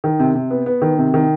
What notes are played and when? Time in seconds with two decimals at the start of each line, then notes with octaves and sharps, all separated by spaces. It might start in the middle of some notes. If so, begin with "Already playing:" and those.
0.04 D#3
0.20 C3
0.35 C3
0.50 B3
0.66 B3
0.82 D#3
0.98 C3
1.14 D#3